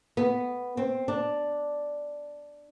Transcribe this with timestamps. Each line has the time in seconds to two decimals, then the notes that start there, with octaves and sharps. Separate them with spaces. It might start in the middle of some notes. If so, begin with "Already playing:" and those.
0.17 B3
0.77 C4
1.08 D4